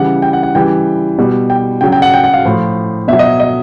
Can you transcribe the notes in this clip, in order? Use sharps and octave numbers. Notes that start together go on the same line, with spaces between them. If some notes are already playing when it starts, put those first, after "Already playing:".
Already playing: C#3 E3 G3 F#5
G5
F#5
F#5
C#3 E3 G3 G5
B2 G3
G5
C#3 F#3 G5
G5
F#5
G5
F#5
F5
A2 F3
B2 F#3 E5
D#5
D#5